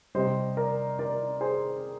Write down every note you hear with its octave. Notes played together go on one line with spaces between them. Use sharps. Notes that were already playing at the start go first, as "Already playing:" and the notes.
C3 G3 C5 D#5
A#4 D5
A#4 D5
G#4 C5